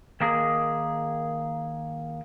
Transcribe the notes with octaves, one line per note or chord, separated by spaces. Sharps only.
D#3 A#3 G#4